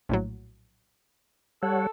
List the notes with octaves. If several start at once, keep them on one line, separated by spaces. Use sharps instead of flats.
A#1 A2 F#3
G3 A4 C#5 F#5